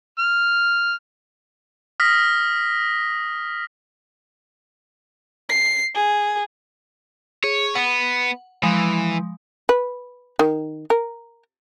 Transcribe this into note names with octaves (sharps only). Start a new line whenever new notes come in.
F6
D#6 F6 A#6 B6
C7
G#4
G#4 C#5
B3 F#5
E3 F3 G#3
B4
D#3
A#4